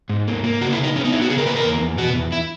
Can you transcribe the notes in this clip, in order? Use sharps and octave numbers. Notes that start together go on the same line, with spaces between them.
G#2
A#3
A#3
C#3 F#4
E4
C#3 D#4
B3 C#4
D#4
B3 E4
F#4
C#3 G#4
A#4
A#3 B4
A#4
E2
E2
B2 F#4
E2
E4